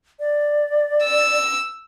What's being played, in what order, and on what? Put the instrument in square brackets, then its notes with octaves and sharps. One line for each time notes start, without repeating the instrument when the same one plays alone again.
[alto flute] D5
[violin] E6